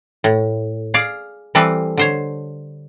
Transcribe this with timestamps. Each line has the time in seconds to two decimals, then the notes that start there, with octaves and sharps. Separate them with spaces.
0.24 A2
0.94 G#4 D5 F5
1.55 E3 G3 C4 A4 B4
1.97 D3 C5 C#5